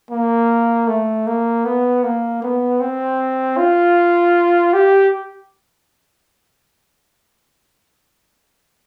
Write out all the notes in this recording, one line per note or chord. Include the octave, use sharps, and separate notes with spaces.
A#3
A3
A#3
B3
A#3
B3
C4
F4
G4